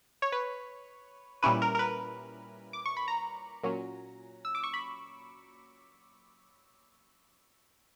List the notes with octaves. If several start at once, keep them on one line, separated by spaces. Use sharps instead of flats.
C#5
B4
A#2 G3 C#4 E4 B4
A#4
A#4
B4
D6
C#6
B5
A#5
A#2 F#3 C#4
E6
D6
C#6
B5